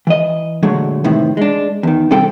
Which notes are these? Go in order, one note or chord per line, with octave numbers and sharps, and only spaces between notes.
E3 D#5
A#2 D3 F#3 G#3 A3
A2 C3 D#3 E3
G#3 D4
E2 D#3
C3 G3 C4 A4 G5